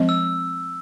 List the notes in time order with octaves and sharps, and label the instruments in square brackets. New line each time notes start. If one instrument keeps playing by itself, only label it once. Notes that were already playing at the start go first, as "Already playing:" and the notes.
Already playing: [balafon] F3 G#3 C4
[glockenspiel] E6